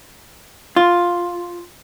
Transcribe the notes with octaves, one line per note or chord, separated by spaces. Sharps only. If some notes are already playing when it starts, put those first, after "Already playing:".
F4